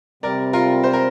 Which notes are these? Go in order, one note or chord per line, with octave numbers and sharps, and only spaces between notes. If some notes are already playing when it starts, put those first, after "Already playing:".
C3 G3 C4 A#4 D5
F4 A#4
C5
A#4